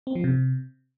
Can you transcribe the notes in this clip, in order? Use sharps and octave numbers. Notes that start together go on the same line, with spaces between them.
C4
F3
C3